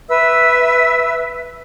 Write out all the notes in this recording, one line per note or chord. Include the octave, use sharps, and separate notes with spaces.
B4 E5 E6